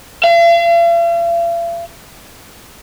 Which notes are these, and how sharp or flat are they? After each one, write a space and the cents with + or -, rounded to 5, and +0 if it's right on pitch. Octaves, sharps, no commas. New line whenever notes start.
F5 -45